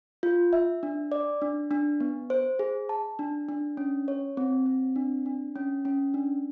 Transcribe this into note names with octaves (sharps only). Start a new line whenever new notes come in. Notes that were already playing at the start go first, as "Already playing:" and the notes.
F4
E5
D4
D5
D4
D4
B3
C5
G#4
A5
D4
D4
C#4
C#5
C4
C4
D4
D4
C#4
C#4
D4